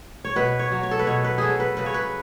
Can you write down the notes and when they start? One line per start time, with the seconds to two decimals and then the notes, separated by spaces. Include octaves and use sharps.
0.25 C#5
0.36 B2 B4
0.59 C#5
0.72 F#3
0.83 C#5
0.91 A4
0.99 B4
1.07 B2 C#5
1.24 B4
1.38 F#3 G#4 A4
1.60 B4
1.77 C#3 B4
1.86 C#5
1.94 B4